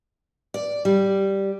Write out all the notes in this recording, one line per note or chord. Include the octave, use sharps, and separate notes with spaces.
D5
G3